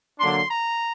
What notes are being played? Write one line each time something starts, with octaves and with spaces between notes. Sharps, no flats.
D3 F#3 A#3 D4 C6
A#5